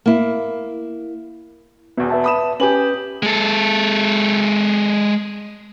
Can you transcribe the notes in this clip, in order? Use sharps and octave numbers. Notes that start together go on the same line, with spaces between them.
A#3 E4
E1 E2 B3
B4 E5 A5
B5 D#6 E7
C#4 G4 B4 G#5 F#7
G#3 A4